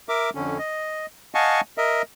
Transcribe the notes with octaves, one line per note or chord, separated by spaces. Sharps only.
A#4 E5 D6
F2 D3 C#4
D#5
D#5 F5 F#5 G#5 A5 C#6
A#4 D#5 E5